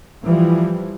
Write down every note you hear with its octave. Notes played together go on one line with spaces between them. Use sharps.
E3 F3 G3